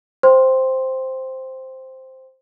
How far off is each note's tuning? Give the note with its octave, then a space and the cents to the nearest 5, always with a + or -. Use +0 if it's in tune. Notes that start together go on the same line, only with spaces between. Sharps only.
C5 +0 G5 +0 C6 +0